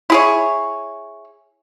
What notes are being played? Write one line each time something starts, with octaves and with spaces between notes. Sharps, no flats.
E4 G#4 C#5